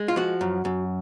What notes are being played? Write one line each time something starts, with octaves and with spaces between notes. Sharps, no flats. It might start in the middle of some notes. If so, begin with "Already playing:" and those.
Already playing: G#3
F4
F3 F#4
F#2
F#2